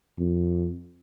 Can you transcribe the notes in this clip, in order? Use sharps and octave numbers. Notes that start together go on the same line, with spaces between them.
F2